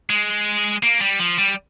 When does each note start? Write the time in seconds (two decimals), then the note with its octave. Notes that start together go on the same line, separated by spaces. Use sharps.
0.10 G#3
0.83 A#3
1.01 G3
1.19 F3
1.38 G3